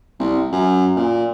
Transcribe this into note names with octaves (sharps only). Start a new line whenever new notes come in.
C2
F#2
A#2